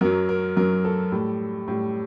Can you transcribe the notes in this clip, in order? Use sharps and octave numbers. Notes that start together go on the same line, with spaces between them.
F#2 F#3 A#4
A#4
F#2 F#3 A#4
A4
A2 G3
A2 G3